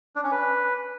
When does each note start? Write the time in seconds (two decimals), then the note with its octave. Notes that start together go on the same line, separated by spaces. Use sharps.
0.16 D4
0.24 C#4
0.32 B4